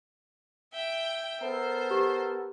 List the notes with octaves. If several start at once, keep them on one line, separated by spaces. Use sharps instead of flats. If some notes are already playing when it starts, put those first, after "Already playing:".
E5 G5
B3 A4 A#4 C5
G4